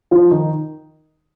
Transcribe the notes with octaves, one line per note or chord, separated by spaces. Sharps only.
F3 F4
D#3 D#4